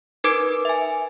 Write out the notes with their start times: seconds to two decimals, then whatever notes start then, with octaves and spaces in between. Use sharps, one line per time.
0.24 D#4 A#4 B4 D6 G#6 D7
0.65 E5 G#5